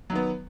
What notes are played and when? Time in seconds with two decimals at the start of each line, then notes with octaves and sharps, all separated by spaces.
0.10 F#3
0.13 D#3
0.15 B3